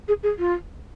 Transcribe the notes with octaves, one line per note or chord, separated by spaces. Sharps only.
G#4
G#4
F4